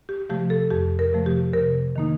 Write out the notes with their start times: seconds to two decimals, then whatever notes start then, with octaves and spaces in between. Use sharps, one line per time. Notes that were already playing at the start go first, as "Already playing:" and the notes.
0.09 G4
0.30 C3 F3 A3 G4
0.50 A4
0.70 F2 G4
0.99 A#4
1.13 C3 F3 A3
1.26 G4
1.53 C3 A#4
1.96 D#3 A#3 D#4